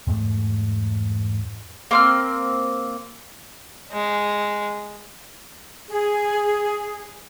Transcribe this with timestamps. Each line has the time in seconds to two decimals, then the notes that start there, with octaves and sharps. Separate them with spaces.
0.07 E2 G#2 G#3 A3
1.91 A#3 C4 F6
3.92 G#3
5.89 G#4